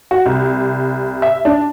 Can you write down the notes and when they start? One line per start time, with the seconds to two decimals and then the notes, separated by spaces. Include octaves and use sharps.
0.11 F#4
0.26 C2
1.22 E5
1.45 D4